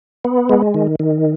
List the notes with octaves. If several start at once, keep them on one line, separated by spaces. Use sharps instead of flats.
B3
G#3
D#3
D#3